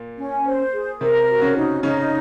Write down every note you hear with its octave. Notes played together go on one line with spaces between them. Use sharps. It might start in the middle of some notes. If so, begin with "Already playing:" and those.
Already playing: A#2 A#3
C#4
C5
G#4
C3 C4 A#4
F#4
C#3 C#4
D#4
C#3 C#4 D#4